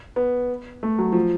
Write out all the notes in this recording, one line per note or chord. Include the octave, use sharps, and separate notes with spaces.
B3
A3
F#3
F3